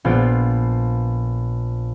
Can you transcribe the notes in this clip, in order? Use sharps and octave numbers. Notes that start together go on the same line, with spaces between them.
A#1 B3 F4 D7